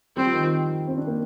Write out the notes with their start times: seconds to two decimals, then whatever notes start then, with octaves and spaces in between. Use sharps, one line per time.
0.17 G3 C4
0.25 F3
0.34 D#3
0.42 F3
0.88 C4
0.98 D4
1.07 A#3